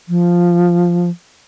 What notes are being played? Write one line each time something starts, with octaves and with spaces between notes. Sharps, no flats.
F3